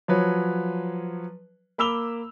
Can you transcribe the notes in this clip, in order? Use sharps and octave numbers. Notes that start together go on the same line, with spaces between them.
F3 F#3 B4 C#5
A#3 B5 D6 E6 F7 G7